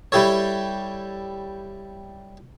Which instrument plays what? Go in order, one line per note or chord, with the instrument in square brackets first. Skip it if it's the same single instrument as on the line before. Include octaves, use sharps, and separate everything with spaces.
[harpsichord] G3 E4 G4 A4 C#5